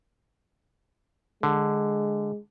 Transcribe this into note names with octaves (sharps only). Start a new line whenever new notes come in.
D3 G#3